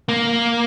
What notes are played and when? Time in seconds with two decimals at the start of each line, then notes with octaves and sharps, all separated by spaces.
0.09 A#3